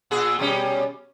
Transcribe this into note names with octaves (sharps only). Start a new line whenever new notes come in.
A#2 G#4
B2 G3 C#4